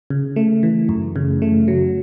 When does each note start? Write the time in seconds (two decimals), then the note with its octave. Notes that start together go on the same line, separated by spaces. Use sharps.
0.10 C#3
0.36 A3
0.63 E3
0.89 F#2
1.16 C#3
1.42 A3
1.68 F#3